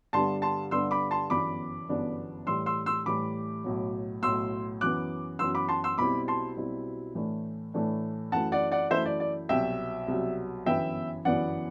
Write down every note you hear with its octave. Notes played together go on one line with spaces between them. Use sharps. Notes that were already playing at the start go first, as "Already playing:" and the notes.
G2 D3 G3 B3 A5 C6
A5 C6
G2 D3 G3 B3 C6 E6
B5 D6
A5 C6
G1 F#2 E3 B3 D4 B5 D6
G1 F#2 E3 B3 D4
A2 E3 G3 C6 E6
C6 E6
C6 E6
A2 E3 G3 B5 D6
B1 A2 F#3
B1 A2 F#3 C6 E6
F#2 E3 B3 D6 F#6
F#2 E3 B3 C6 E6
B5 D6
A5 C6
C6 E6
B1 B2 G3 C4 E4 B5 D6
A5 C6
B1 B2 G3 C4 E4
A2 E3 A3 D4
A2 E3 A3 D4
F#2 E3 A3 E4 F#5 A5
D5 F#5
D5 F#5
F#2 E3 A3 E4 C5 E5
D5
D5
C2 B2 F#3 E5 G5
C2 B2 F#3
G1 F#2 E3 B3 E4 E5 G5
G1 F#2 E3 B3 E4 D5 F#5